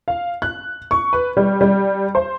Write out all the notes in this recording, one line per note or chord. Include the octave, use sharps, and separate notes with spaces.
F5
F#6
C#6
B4
G3
G3
C5